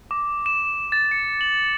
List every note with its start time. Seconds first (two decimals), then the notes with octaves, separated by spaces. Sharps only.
0.11 D6
0.46 E7
0.92 A6
1.11 C#7
1.41 F#7